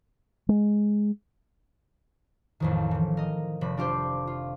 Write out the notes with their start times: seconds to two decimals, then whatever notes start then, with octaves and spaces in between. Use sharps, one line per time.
0.49 G#3
2.60 A1 F2 D#3
2.91 E3 F3
3.17 A#4 D#5
3.61 F1 C3 B5
3.77 D4 F4 G4 C5
4.27 F4